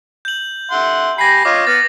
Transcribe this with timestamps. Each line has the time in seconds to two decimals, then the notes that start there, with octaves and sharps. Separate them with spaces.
0.25 G6 F#7
0.71 E5 F#5 C6
1.18 G4 G#5 B5 A#6 C7
1.45 F4 C#5 D#5 D6
1.67 B3 F6 A6